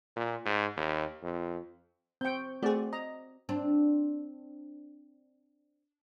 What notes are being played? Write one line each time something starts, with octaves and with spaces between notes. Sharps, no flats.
A#2
G#2
D#2
F2
C4 G5 C#6 G6
A3 C4 F#4 G#4 D5
D#5 A#5
C4 D4